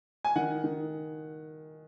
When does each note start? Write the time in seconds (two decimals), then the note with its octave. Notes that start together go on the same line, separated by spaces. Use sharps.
0.25 G#5
0.36 D#3 F#5
0.64 D#3